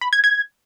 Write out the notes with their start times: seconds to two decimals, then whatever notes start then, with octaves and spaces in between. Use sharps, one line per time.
0.01 B5
0.13 G#6
0.24 G#6